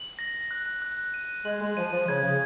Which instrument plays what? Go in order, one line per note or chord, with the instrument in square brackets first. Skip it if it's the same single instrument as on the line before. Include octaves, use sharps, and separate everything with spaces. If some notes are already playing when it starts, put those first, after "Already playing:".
Already playing: [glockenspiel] F#7
A#6
F#6
F#6
D#7
[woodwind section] G#3 [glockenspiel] F#7
[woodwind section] G#3
[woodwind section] F3 [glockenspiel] D#7
[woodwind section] F3
[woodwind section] C#3 [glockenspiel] G#6
[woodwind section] C#3